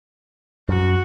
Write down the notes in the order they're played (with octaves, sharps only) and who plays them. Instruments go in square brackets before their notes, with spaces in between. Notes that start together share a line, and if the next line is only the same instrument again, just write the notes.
[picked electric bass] F#2 [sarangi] F#4